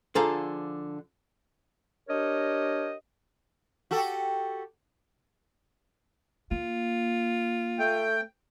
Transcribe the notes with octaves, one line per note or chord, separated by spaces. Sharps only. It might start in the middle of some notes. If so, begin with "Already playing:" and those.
D3 F3 G#4 A4 F5 A#5
D4 G4 A#4 C#5 D#5
F#4 G4 A4
A#3 F4
A3 G5